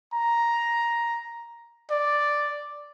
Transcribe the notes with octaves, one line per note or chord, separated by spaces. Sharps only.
A#5
D5